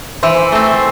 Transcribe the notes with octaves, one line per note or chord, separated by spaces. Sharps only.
E3 C5 E5
A3 C4